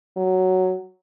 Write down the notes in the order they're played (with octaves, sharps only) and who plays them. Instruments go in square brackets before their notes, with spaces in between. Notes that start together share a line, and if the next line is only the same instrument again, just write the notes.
[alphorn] F#3